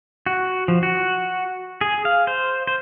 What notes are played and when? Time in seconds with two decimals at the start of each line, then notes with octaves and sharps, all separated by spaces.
0.26 F#4
0.68 F3
0.83 F#4
1.81 G#4
2.05 F5
2.27 C5
2.67 C5